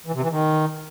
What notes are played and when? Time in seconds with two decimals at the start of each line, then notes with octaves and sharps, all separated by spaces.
0.06 E3
0.14 C3
0.22 E3
0.30 D#3